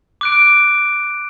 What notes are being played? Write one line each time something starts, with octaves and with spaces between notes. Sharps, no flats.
D6 F#6 D7